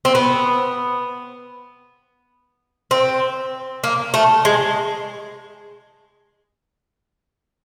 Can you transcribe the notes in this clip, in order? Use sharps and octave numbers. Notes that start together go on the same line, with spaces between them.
C4
B3
C4
A#3
A3
G#3